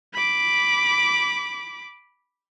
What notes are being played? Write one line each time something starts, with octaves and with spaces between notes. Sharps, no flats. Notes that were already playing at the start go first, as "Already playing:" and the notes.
B5 D6